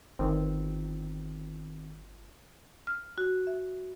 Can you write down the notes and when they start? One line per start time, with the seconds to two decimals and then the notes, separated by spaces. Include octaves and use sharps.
0.19 G1 D#3 C4
2.87 F6
3.18 F#4
3.47 E5